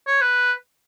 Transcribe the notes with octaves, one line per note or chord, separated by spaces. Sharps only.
C#5
B4